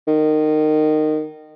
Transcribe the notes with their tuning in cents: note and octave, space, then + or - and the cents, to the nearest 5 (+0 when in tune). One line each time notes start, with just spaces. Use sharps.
D#3 -20